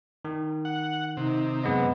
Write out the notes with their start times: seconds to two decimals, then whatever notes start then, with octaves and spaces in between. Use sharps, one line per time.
0.25 D#3
0.65 F#5
1.17 C3 D#4
1.64 F#2 G#3 B3 B4 D#5